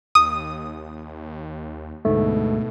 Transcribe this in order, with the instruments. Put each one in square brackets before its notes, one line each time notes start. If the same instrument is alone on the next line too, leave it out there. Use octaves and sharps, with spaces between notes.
[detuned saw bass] D#2 [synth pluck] D#6
[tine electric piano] D2 G#2 A3 [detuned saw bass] B2